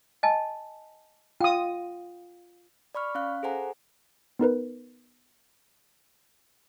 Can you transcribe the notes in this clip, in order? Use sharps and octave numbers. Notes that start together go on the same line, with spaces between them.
D#5 G#5 A5
F4 G5 D#6
D5 B5 C#6 F6
C#4 F5 F#6
G#4 A4 C5 F#5 G#5 A#5
B3 D#4 A#4 B4